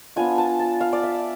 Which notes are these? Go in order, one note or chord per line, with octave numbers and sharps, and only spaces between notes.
B3 D4 F4 G#5
A5
A5
F5
D5
E5